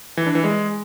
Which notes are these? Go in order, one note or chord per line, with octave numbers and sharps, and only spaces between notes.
E3
D4
E3
G#3